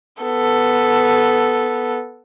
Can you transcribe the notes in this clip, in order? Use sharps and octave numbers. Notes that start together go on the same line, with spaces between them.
B3 A4